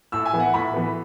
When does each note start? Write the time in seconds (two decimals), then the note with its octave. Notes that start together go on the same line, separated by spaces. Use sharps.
0.12 A2 E6
0.25 G#5
0.33 E3 B3
0.40 F#5
0.54 A2 B5
0.74 E3 B3